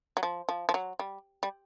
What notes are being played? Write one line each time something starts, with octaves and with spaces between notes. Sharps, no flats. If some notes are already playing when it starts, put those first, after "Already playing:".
F#3
F3
F3
F3
F#3
G3
G3